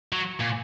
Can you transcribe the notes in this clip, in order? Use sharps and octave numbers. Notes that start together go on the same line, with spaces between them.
F#3
A#2